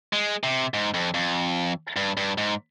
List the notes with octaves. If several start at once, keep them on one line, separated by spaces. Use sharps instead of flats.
G#3
C3
G#2
F2
F2
G2
G2
G#2